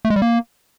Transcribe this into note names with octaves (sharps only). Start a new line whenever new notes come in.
A3
G#3
G3
A#3